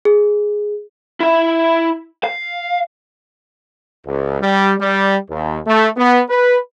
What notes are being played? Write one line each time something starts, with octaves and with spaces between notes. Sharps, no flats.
G#4
E4 E5
F5
C#2
G3
G3
D#2
A3
B3
B4